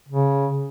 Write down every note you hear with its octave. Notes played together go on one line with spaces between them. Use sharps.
C#3